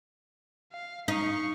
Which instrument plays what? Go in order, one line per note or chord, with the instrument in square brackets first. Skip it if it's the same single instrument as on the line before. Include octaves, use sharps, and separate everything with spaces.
[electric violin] F5
[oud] D#4 [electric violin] F5 C#6